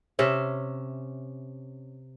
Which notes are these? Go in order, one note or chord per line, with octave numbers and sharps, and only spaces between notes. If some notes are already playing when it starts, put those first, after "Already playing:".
C3 C#4 E5